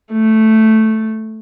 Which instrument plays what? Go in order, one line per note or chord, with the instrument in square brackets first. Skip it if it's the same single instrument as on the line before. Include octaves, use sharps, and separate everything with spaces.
[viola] A3